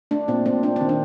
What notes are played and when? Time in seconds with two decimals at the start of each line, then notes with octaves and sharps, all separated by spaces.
0.11 A3 D4
0.28 A#2 C4
0.46 A3 C4
0.63 A3 D4
0.76 D#3 C4
0.89 D4